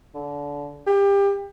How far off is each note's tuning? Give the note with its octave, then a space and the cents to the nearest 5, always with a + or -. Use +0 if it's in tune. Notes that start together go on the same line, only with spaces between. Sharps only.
D3 -25
G4 +25